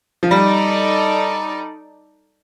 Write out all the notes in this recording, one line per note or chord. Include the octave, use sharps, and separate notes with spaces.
F3
G3 D#4 A4 D5